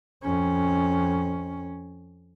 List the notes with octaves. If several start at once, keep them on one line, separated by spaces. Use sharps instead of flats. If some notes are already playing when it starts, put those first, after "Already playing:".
F2 C#4